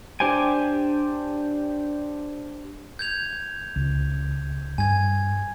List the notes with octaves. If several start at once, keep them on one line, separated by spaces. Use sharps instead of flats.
D4 G4 C5 G5 G#5
G6 G#6 F7
C#2
G2 G#5 G#6